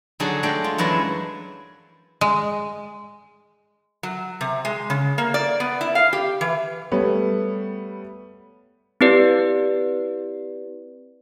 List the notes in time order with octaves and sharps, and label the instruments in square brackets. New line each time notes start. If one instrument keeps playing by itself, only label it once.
[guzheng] D3 F#3 D#4 F#4 G#4 A4
G#3 A3 D4 A4 G5
F4
F#2 E3 G#3 E4 C#5 A5
[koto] G#3
[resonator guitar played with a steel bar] F#3
C3
G#3
C#3
A#3
D5
B3
E4
F5
G4
E3
[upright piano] G3 A3 B3 C#5
[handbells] C4 E4 G4 B4 D5